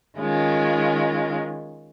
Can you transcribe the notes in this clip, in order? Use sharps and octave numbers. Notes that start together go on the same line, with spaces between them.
D#3 G#3 C#4 F4